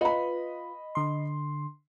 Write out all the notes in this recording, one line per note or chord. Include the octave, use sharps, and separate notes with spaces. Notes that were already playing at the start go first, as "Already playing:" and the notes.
F4 B4 D#5 B5
D3 C6